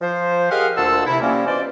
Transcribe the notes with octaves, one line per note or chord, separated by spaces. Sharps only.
F3 C5
G4 G#4 A#4 D#5 F5 F#5
D2 A#2 C5 F#5 A5 E6
C3 E4
F3 G3 A#3 C#4
B2 E3 C5 D5